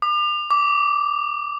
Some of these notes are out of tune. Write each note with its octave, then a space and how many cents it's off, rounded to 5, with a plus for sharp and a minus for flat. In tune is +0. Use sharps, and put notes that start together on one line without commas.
D6 +40
D6 -15